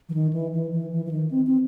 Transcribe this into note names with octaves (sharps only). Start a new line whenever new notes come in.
E3
D#3
E3
E3
E3
E3
E3
D#3
C4
C4